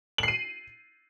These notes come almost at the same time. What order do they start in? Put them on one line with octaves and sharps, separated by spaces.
F#7 C7 D#7